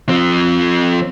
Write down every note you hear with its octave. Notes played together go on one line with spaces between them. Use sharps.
F3 C4